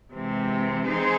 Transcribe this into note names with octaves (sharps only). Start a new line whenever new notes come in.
C3 E3 G#3 C4
C4 D#4 G#4 C5